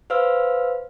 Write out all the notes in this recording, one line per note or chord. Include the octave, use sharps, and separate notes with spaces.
B4 C5 F5 E6 F6